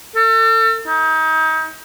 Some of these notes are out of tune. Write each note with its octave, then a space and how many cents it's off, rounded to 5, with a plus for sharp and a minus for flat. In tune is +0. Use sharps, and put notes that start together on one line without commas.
A4 +35
D#4 +35